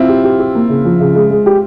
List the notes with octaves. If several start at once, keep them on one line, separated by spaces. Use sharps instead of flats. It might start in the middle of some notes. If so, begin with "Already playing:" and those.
Already playing: C4 E4 F4
G4
G4
G4
A#3
C#3
F3
C#3
G#3
G#3
G4